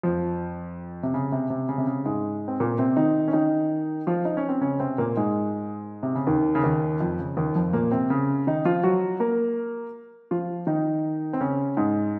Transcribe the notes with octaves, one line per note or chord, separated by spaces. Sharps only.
F2 F3
C3
C#3
C3
C3
C#3
C3
C#3
G#2 G#3
C4
A#2 A#3
C3 C4
D#3 D#4
C#4
D#3 D#4
F3 F4
D#4
C#4
C4
C#3 C#4
C3 C4
A#2 A#3
G#2 G#3
C3
C#3
D#2 D#3
C#3
D#2 D#3
F2 F3
C#3
D#2 D#3
F2 F3
A#2 A#3
C3 C4
C#3 C#4
D#3 D#4
F3 F4
F#3 F#4
A#3 A#4
F3 F4
D#3 D#4
C4
C#3 C#4
G#2 G#3